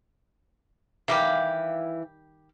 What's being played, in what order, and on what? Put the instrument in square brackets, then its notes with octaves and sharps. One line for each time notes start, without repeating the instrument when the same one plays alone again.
[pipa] D#3 G3 G4 [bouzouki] E3 F5